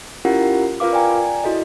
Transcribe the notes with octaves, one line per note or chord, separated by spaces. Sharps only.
C#4 E4 F4 G4 A#4 F#5
F4 A#4 B4 F5 D6
D5 G5 G#5 A#5
E4 F#4 A4 D#5